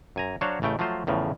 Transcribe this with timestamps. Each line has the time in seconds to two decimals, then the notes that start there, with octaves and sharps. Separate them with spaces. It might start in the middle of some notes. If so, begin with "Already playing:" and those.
0.16 F#2 G#5 A#5
0.41 F#3 D4 F#4 C5 C#5 F5
0.62 A1 C#3 A3 G5
0.79 F3 F#3 A3 F4 C5
1.07 E2 A2 C#3 F3